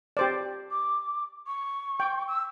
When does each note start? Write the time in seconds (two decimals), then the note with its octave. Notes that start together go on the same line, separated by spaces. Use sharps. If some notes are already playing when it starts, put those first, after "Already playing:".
0.17 G4 C5 D5
0.70 D6
1.47 C#6
2.00 G5
2.28 E6